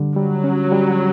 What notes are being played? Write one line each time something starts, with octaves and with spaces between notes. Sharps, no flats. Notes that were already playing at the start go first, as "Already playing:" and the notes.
Already playing: D3 G3
F#3 G3
C#4
G3